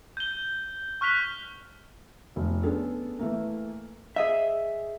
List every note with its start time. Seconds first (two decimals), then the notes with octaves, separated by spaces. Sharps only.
0.17 G6 G7
1.01 C#6 F6 F#6 B6 F7 G7
2.36 F1
2.63 B3 C#4 D4 G#4 A4
3.19 E3 A3 A#3
4.16 G#4 D#5 E5